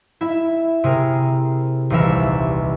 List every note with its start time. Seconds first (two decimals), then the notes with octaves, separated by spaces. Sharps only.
0.21 E4 E5
0.84 C3 G#4 A#4
1.90 D#1 C2 E3 A#4 E5